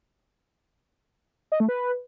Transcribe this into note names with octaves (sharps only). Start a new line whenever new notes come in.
D#5
A3
B4